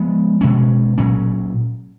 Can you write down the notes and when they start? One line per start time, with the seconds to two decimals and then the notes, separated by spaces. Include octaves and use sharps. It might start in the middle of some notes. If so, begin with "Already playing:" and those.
Already playing: F3 G#3 B3
0.41 B2 G#3 C#4
0.98 A#2 F#3 C#4